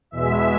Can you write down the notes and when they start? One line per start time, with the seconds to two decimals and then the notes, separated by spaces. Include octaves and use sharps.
0.11 E2 B2 G#3 E5